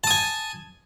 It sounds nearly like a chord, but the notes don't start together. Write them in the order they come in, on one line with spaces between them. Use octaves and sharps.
A5 D#6 G#5